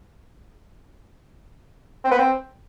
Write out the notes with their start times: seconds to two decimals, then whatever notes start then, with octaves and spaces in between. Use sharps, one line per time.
2.04 C4
2.11 B3
2.18 C4